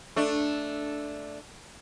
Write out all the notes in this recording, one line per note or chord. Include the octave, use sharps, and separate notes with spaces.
A3 D4